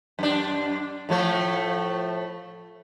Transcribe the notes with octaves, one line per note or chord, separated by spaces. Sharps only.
F#2 D4
A2 F3 A3